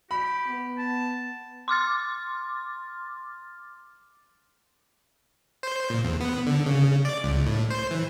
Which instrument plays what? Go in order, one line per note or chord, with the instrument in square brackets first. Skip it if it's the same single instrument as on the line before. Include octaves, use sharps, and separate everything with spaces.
[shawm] G4 [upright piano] B5
[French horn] B3
[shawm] A5
[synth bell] C6 D6 F6 A6
[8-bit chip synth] C5
A#2
E2
B3
D3
C#3
D5
C#2
A2
C5
E3